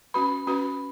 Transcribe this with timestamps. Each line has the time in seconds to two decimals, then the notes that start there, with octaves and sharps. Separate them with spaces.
0.14 C#4 F#4 B4 B5
0.47 C#4 F#4 B4